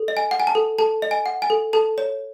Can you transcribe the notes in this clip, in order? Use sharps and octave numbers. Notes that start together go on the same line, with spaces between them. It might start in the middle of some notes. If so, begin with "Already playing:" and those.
Already playing: A4
D#5
G#5
F#5
G#5
A5
A4
A4 A5
D#5
G#5
F#5
G#5
A4
A4 A5
C#5